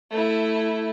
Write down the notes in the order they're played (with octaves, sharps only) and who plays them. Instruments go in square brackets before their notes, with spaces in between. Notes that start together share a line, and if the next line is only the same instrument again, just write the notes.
[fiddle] A3 E4